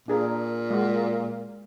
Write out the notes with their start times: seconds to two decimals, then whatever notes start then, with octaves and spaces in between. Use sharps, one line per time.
0.08 A#2 D4 G#4 A#4
0.70 G#3 F#4